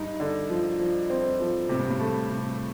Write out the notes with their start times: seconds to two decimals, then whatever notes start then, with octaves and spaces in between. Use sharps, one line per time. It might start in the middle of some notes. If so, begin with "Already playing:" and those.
Already playing: G2 D#4
0.20 D3
0.50 F3
0.80 F3
1.10 C4
1.40 F3
1.69 A2 C3
1.80 G2
1.91 A2
2.00 A3
2.30 C3